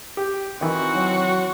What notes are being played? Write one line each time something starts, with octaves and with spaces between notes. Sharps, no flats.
G4
D#3 E3 C4 F#4
F#3